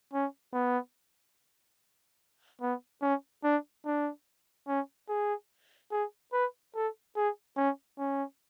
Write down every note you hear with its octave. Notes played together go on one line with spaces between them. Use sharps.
C#4
B3
B3
C#4
D4
D4
C#4
G#4
G#4
B4
A4
G#4
C#4
C#4